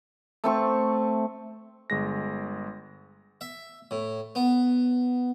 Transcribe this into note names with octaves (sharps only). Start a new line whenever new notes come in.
A3 C4 C#6
G1 G#3 A#6
E5
A2
B3